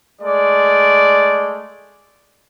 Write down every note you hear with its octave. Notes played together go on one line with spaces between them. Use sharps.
G#3 A3 D5